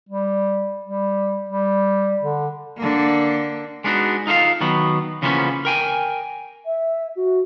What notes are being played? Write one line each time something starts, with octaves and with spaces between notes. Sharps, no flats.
G3
G3
G3
D3
D3 A#3
G#3 B3 D4 D#4 F#4
D#4 F4 A4 C5 F5
D#3 F#3 B3
C#3 E3 F3 A#3 B3 C#4
A#4 G5 G#5
E5
F#4